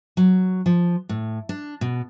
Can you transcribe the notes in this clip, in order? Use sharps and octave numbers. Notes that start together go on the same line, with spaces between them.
F#3
F3
A2
D4
B2